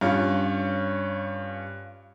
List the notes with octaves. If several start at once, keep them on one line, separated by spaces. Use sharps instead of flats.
G2 C#4 F4